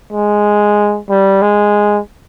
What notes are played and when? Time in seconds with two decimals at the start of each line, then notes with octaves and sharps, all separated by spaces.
0.13 G#3
1.09 G3
1.42 G#3